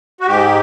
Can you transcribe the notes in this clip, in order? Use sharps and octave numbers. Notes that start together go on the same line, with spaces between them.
F#4
G#2 G4